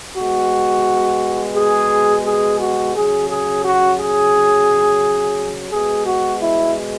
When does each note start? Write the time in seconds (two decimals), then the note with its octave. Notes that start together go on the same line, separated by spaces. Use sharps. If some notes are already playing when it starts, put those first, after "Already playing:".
0.16 B2 G#3 F#4
1.55 G#4
2.25 G#4
2.60 F#4
2.94 C#3 F#3 G#4
3.29 G#4
3.64 F#4
3.98 G#4
5.71 B2 G#3 G#4
6.06 F#4
6.41 E4